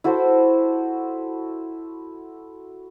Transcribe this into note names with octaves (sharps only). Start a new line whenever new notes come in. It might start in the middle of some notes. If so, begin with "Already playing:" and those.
E4 F#4 A4 C5